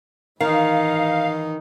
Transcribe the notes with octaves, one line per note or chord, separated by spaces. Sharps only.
D#3 E3 D#4 F5